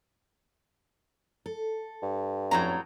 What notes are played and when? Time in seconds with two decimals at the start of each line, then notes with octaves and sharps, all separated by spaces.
1.46 A4
2.02 G2
2.51 F2 A2 F#3 C#4 A#5